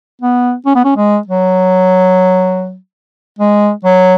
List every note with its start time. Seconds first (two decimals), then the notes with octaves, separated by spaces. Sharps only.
0.22 B3
0.66 C#4
0.76 B3
0.85 C#4
0.97 G#3
1.28 F#3
3.39 G#3
3.85 F#3